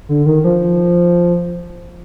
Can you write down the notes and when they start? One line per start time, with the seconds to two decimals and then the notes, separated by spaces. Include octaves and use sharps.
0.09 D3
0.26 D#3
0.44 F3